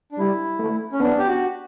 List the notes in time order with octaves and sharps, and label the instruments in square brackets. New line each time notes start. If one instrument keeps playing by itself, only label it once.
[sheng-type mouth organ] D4
[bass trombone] G3 [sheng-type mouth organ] E4
[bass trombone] A3
[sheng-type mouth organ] C#4
[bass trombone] B3 [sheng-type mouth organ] D4
[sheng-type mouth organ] G4
F#4